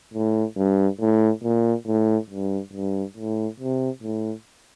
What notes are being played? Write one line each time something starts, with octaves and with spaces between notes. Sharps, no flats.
A2
G2
A2
A#2
A2
G2
G2
A2
C3
A2